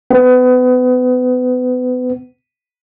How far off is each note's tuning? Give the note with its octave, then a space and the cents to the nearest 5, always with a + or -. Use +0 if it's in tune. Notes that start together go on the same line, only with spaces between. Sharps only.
B3 +30